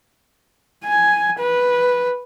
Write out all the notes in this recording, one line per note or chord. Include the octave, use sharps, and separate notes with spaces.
G#5
B4